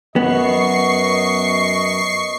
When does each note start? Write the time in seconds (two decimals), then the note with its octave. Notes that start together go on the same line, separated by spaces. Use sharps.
0.16 F#2 B3 D#5 C#6 C7